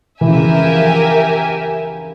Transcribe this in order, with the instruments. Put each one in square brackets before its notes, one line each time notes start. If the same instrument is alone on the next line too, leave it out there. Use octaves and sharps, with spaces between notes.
[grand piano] E3 [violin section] G4 A#4 E5 G#5
[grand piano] C#3
E3
F3